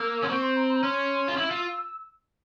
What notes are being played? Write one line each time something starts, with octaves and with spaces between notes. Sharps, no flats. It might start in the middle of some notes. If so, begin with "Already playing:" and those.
Already playing: A#3 E6
C#4 C6
C4 C#6
C6
A#5
C6
A#5
C#4 C6
F4
E4 E6
F4